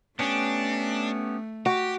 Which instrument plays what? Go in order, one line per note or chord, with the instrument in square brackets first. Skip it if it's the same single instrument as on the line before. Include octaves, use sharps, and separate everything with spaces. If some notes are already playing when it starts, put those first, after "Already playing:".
[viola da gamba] A3 [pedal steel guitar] B3 C#4 G4 [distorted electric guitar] D4
[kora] F#4 [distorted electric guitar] G4